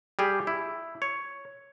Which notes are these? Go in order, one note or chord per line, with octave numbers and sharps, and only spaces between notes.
G3 G4 G#4
E4
C#5